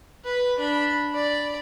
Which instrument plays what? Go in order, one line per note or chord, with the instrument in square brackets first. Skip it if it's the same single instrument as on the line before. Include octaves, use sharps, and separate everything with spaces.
[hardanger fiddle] B4
D4 B5
D5 B5